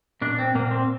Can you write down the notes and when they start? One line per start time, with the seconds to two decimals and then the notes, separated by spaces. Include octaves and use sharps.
0.21 A#2 D4
0.39 C4
0.55 A#2 A#3
0.71 C4